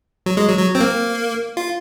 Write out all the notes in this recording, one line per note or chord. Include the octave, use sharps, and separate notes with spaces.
F#3
G#3
F#3
F#3
C4
A#3
F4